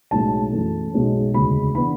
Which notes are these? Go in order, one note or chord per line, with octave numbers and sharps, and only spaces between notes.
B1 A2 G#3 C#4 A5
F#2 E3 A3
B1 B2 G#3 C#4
E1 D2 C#3 G#3 B5
E3 B3 D4 B5